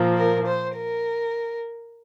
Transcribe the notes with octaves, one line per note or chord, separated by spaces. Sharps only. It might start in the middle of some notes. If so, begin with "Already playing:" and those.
Already playing: A#2 F3 A#3
A#4
C5
A#4